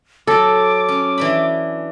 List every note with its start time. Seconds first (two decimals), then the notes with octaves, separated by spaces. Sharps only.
0.27 F#3 A4 D6
0.88 C#4
1.18 E3 D4 B5